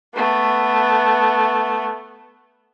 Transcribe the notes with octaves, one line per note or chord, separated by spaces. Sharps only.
A3 B3